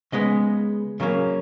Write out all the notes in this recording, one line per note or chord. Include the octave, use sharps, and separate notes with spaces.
C#3 G#3 B3 D#5
C#3 F#3 A#3 C#4